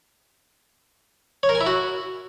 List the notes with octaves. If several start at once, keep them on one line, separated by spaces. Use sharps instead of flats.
C#5
A#4
G#5
E4
F#4